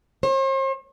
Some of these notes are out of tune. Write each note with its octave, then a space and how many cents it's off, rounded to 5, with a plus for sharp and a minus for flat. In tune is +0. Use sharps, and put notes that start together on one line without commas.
C5 +45